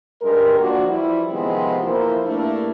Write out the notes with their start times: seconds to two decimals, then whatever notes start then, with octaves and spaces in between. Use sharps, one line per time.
0.22 G2 G#3 G4 A#4
0.59 F3 A#3 D4 F#4
0.89 E3 F3 G3 E4
1.32 C3 D#3 F3 G#3 B3 C4
1.82 F2 E3 A#3 E4 A#4 C5
2.25 G2 A3 A#3 D4 E4